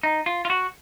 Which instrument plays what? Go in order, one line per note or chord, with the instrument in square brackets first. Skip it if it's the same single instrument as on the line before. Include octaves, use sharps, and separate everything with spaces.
[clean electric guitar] D#4
F4
F4
F#4